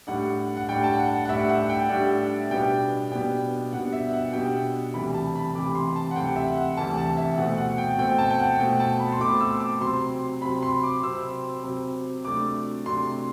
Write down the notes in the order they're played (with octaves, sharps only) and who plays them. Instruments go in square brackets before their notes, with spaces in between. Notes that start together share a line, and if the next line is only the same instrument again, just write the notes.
[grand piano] A2 G3 D4 F#5
F#5
A2 G3 D4 G5
A5
F#5
F#5
F#5
A2 G3 D4 E5
F#5
G5
A2 G3 D4
B2 G3 B3 D4 G5
B2 G3 B3 D4 G5
B2 G3 B3 D4 F#5
E5
F#5
B2 G3 B3 D4 G5
D2 C3 E3 G3 B5
A5
B5
D2 C3 E3 G3 D6
C6
A5
F#5
D2 C3 E3 G3 G5
E5
F#5
D2 C3 E3 G3 A5
A5
E5
B2 A3 C4 F#5
F#5
G5
B2 A3 C4 G5
A5
G5
F#5
B2 A3 C4 G5
A5
B5
C6
B2 A3 C4 D6
E6
D6
C3 F#3 C4 C6
C3 F#3 C4 B5
C6
D6
C3 F#3 C4 E6
C3 F#3 C4
C3 F#3 A3 D4 D6
C3 F#3 A3 D4 C6